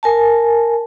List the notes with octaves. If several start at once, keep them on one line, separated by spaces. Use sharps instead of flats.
A#4 G#5 A5